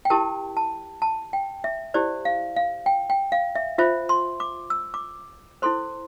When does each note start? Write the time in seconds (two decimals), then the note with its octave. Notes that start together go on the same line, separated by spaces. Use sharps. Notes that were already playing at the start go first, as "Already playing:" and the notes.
0.05 G5
0.10 E4 G4 A#4 A5
0.57 A5
1.02 A5
1.33 G5
1.64 E5
1.94 E4 G4 C5 D5
2.25 F5
2.56 F5
2.86 G5
3.10 G5
3.32 F5
3.55 E5
3.78 F4 C5 E5
4.09 C6
4.40 D6
4.70 E6
4.94 D6
5.62 E4 A4 C5 C6